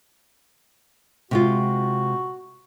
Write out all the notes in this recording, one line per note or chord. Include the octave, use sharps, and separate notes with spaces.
C3 G#3 F4 F#4